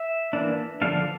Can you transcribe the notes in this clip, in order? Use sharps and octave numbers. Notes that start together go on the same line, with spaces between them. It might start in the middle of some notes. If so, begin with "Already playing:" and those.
Already playing: E5
E3 A#3 D4
D3 F3 A3 D4 F5